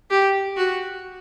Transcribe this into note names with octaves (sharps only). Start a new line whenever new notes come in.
G4
F#4